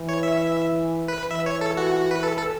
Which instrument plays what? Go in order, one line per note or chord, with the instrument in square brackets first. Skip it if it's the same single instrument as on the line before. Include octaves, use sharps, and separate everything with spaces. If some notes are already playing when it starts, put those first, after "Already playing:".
Already playing: [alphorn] E3
[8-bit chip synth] C#5
E5
B4
[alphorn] E3 [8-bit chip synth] E5
[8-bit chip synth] C#5
A4
F#4
B4
A4
A4